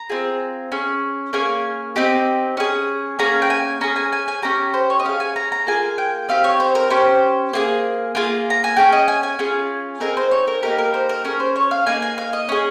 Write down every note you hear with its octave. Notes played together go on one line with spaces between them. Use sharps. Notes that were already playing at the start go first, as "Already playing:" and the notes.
Already playing: A#5
C4 F4 G#4
C#4 G#4
A#3 C#4 G#4 G#5
C4 D#4 G4
C#4 G#4
A#3 C#4 G#4 A#5
G5
G#5
C#4 G#4 A#5
G#5
G#5
G#5
C#4 G4 A#5
C5
C#5
D#5
C#4 G#4 F5
G#5
A#5
A#5
A#3 F4 G#4 G#5
G5
C4 D#4 G4 F5
C#5
C5
A#4
C#4 G4 C5
A#3 F4 G#4
A#3 F4 G#4
A#5
G#5
C#4 F4 G#4 G5
D#5
G#5
G#5
C#4 F4 G#4
C4 D#4 G#4 A#4
C5
C#5
A#4
A#3 D#4 G4 A#4
A#4
C5
A#4
C#4 G#4 A#4
C5
C#5
F5
A#3 D#4 G#4 G#5
G#5
F5
D#5
C#4 G#4